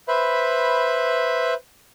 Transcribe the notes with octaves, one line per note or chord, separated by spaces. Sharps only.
B4 C5 E5 B5